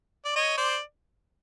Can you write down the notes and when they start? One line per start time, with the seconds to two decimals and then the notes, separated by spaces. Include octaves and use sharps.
0.25 D5
0.36 C#5 D#5
0.57 C5 D5